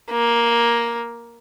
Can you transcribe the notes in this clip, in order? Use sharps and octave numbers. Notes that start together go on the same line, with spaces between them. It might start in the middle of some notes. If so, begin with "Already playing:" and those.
A#3